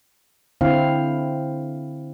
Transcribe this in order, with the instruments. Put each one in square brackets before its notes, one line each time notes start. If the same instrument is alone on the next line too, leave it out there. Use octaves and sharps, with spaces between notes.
[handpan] D3 C4 E4 F5